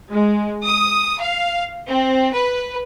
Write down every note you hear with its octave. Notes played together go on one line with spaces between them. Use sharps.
G#3
D#6
F5
C4
B4